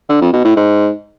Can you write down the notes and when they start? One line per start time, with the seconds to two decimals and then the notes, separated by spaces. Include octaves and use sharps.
0.09 D3
0.21 F2
0.33 B2
0.45 A2
0.56 G#2